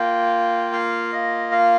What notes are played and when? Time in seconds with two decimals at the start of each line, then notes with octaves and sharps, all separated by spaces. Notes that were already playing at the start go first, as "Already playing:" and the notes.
Already playing: A#3 F4 G5
0.73 F5
1.12 D#5
1.52 F5